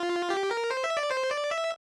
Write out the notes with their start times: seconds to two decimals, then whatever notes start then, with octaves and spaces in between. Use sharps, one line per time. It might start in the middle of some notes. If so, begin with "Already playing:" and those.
Already playing: F4
0.30 G4
0.51 A#4
0.71 C5
0.84 E5
0.97 D5
1.11 C5
1.31 D5
1.51 E5